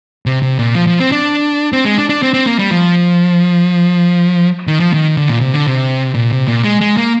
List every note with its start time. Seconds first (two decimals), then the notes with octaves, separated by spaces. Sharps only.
0.26 C3
0.42 C3
0.59 A#2
0.75 F3
0.87 F3
1.00 C4
1.12 D4
1.73 C4
1.85 G#3
1.98 D4
2.09 D4
2.23 C4
2.34 C4
2.46 A#3
2.59 G3
2.71 F3
4.67 D#3
4.80 F3
4.93 D#3
5.17 D3
5.29 A#2
5.41 C3
5.54 D3
5.67 C3
6.15 A#2
6.32 C3
6.48 A#2
6.64 G#3
6.81 G#3
6.97 A#3